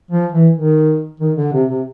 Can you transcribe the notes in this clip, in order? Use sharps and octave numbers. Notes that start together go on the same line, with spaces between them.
F3
E3
D#3
D#3
D3
C3
C3